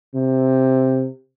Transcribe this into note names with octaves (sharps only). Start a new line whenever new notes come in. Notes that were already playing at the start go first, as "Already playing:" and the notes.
C3